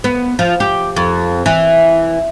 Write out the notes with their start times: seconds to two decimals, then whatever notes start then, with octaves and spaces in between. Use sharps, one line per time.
0.04 B3
0.39 F3
0.60 G4
0.96 F2
1.46 E3